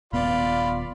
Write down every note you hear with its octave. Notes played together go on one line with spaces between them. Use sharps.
D#1 B3 F4 D5 B5